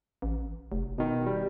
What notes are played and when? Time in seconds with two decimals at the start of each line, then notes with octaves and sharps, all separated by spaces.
0.22 A1
0.72 F1
0.98 B2 D#3
1.26 G3